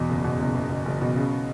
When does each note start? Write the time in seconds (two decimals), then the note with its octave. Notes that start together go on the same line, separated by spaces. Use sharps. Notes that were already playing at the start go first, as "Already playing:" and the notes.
Already playing: E2 B2
0.09 F#1
0.24 B2
0.40 F#1
0.54 F#1
0.70 F#1
0.85 F#1
1.01 B2
1.16 C#3